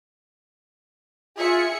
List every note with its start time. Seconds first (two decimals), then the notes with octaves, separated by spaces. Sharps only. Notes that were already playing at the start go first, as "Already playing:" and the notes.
1.38 F4 G#4 E5 C#7